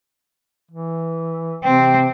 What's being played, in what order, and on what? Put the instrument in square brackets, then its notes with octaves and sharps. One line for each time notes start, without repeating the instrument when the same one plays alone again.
[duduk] E3
[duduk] C3 [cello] C4 [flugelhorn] G5